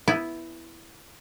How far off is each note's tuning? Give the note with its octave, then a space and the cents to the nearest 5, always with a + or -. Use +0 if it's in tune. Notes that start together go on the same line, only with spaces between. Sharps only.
B3 +0 E4 +0